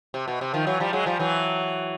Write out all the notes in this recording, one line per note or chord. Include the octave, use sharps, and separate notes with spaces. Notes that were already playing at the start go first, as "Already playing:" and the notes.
C3
B2
C3
D#3 F3
E3 F#3
F3 G3
F#3 G#3
F3 G3
E3 F#3